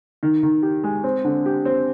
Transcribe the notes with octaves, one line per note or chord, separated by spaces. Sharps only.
D#3
D#3
G4
G#3
C4
D3
G4
C4